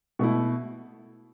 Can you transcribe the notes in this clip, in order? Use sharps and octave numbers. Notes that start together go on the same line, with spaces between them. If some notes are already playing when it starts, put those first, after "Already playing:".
B2 A3 E4